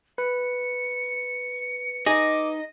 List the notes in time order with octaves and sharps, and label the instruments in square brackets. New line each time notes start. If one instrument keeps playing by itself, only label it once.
[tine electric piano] B4 [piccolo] C#7
[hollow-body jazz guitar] D#4 G#4 [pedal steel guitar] D#5 [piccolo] D6